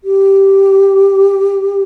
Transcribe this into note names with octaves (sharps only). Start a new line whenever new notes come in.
G4